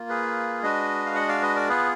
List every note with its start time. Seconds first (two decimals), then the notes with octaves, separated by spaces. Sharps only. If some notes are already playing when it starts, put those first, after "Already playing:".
Already playing: A#3 F4
0.09 G#4 B4
0.63 G#3 D4 F#4 B4 D#5
1.06 F5
1.15 D#5 F#5
1.29 D5 F5
1.42 B4 D#5
1.55 A#4 D5
1.69 B3 F4 G#4 B4